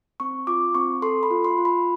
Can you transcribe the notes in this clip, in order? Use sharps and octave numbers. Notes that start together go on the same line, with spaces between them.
C4 C#6
F4 D6
C4 C#6
A4 C6
B5
F4
C6
F4
B5